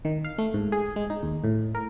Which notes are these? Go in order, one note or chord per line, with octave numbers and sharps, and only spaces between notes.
D#3
F5
A3
G#2
G#4
G#3
D#4
D#2
A2
A#4